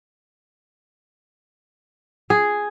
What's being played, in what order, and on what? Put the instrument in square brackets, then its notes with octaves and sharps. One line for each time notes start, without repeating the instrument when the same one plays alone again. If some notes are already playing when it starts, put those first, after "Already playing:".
[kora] G#4